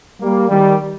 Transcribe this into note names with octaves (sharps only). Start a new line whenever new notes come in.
G3 A#3
D#3 G3